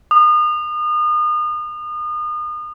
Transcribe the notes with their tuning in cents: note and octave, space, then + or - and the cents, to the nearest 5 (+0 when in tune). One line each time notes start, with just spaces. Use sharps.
D#6 -35